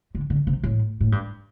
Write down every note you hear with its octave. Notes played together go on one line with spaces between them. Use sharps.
D3
D3
C3
A2
A2
G2